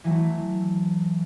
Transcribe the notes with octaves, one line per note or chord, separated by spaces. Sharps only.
E3 F#3 A3